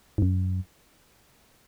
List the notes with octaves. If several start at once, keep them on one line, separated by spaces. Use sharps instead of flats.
G#2
F#2